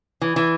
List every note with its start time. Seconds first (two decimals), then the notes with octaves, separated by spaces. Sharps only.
0.21 E3
0.36 E3